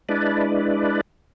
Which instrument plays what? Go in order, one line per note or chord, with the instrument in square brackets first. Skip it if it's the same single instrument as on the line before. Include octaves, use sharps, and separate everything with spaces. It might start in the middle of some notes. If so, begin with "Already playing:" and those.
[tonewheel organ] G#3 D4 E4 B4 D5